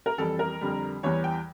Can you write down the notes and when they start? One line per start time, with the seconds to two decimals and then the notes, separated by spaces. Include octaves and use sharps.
0.06 A#4
0.18 F2 E3 G3 A4
0.39 A#4
0.61 F2 D3 G3
1.03 E2 E3 G3 C#5
1.24 G5